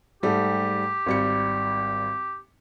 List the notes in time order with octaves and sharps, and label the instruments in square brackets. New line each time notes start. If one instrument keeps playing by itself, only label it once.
[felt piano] G#2 G3 A3 [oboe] G4
[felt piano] G#1 G3 C#7